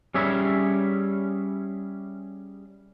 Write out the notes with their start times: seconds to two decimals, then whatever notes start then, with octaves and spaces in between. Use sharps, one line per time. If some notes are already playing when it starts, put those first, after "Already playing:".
0.14 G3 C#4 G#4 C#5 E5